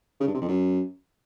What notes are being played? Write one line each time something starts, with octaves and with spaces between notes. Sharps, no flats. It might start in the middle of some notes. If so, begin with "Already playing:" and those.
C#3
G2
C3
F2
F#2